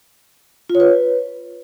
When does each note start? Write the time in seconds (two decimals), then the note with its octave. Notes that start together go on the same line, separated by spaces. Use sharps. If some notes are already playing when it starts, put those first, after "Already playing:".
0.70 F4
0.75 C#5
0.80 B4